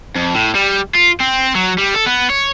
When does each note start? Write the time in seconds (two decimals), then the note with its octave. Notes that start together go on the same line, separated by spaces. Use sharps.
0.16 F2
0.35 A2
0.55 G3
0.95 F4
1.21 C4
1.55 F#3
1.78 G3
1.95 A4
2.06 B3
2.30 C#5